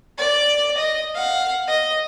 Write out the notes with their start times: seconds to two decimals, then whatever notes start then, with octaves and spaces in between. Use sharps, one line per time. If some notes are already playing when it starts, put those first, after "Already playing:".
0.18 D5
0.77 D#5
1.15 F5 F#5
1.68 D#5